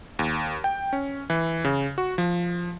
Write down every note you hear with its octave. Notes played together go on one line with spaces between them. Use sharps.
D#2
G5
C#4
E3
C#3
F#4
F3